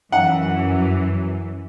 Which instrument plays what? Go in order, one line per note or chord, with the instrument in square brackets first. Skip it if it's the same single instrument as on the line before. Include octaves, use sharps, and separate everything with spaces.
[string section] F#2 E3 [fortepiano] F#5